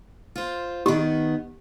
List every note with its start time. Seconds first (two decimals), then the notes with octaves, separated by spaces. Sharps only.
0.36 F4 C5
0.86 D#3 B3 G4